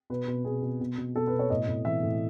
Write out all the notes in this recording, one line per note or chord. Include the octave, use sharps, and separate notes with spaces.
B2 B4
B2
B2 G#4
B2
B2
B2
B2 A4
B4
B2
C#5
A2 D#5
A2
E3 E5
A2